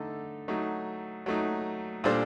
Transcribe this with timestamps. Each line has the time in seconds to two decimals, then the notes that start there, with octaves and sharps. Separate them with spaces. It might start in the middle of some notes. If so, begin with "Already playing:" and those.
Already playing: D3 A3 D#4 A4
0.48 F#3 A3 D#4
1.26 F#3 A3 D#4
2.04 A#2 G3 D4 A4 C5